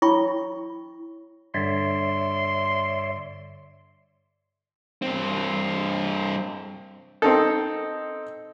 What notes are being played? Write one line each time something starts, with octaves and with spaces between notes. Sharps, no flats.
E4 C#5 G5 B5 C#6
G2 D3 C#5 D5 E5 C6
G2 C4
C4 D#4 A4